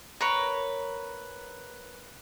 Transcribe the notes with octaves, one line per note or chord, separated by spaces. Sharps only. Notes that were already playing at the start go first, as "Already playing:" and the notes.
A#4 B4 C#5